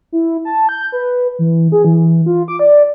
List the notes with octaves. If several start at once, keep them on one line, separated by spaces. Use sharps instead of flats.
E4
A5
G6
B4
E3
G#4
E3
F4
D6
D5